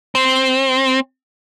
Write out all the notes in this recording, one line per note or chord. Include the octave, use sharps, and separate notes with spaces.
C4